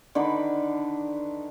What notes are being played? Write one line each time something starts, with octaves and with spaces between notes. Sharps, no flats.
D3 D#3 B4 B5